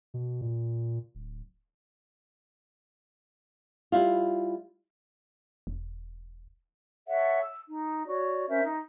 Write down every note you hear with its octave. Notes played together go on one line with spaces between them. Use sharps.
B2
A#2
D1
G3 E4 F4
E1
A4 C#5 E5 F#5
E6
D#4
F#4 C#5 D5
C#4 A#4 C5 E5
D#4